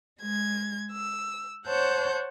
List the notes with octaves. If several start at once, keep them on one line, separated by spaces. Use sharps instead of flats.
G#3 G#6
E6
C5 C#5 F#5 A5 G6